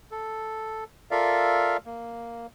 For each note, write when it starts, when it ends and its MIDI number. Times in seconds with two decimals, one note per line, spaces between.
0.11 0.84 69
1.11 1.77 65
1.11 1.77 69
1.11 1.77 70
1.11 1.77 74
1.11 1.77 76
1.11 1.77 77
1.86 2.47 58